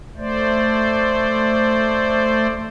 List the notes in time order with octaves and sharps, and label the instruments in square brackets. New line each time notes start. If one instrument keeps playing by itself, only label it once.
[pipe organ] A3 C5 D5